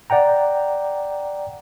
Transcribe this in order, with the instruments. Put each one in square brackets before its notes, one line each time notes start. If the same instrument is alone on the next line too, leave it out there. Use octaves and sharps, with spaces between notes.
[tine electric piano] D5 F#5 G5 A#5